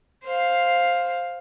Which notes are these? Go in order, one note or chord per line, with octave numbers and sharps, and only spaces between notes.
C5 F5